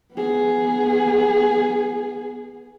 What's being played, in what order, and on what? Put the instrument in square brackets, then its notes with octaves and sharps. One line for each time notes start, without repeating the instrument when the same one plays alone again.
[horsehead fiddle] B3 G#4